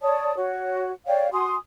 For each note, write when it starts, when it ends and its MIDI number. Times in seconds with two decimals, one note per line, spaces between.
0.01 0.33 73
0.01 0.33 74
0.01 0.33 81
0.01 0.33 87
0.36 0.91 66
0.36 0.91 73
1.06 1.29 73
1.06 1.29 74
1.06 1.29 77
1.06 1.29 79
1.31 1.54 66
1.31 1.54 80
1.31 1.54 84
1.31 1.54 87